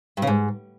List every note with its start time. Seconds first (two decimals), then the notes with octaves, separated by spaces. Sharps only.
0.17 G2
0.22 C#3
0.27 G#2